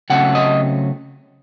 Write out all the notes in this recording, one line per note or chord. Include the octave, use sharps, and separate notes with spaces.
C#3 F#3 A3 C4 F#5
D#5